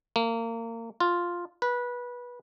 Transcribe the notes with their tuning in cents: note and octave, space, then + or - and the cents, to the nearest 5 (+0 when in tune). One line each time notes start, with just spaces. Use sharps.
A#3 -30
F4 +0
B4 -20